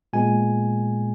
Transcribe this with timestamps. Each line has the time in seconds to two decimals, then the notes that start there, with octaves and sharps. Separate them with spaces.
0.13 A#2 G#3 B3 G#5